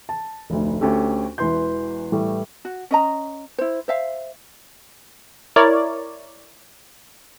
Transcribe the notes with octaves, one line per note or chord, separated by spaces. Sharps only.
A5
F1 D2
D2 C#4 G4 A4
E1 E2 E3 B4 C6 G6
A2 E3 G3 A3
F#4
C#4 D#5 A#5
E4 C5
C5 E5 F5
E4 A#4 C#5 D5